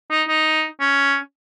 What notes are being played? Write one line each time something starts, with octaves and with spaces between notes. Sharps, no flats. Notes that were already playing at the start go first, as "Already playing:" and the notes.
D#4
D#4
C#4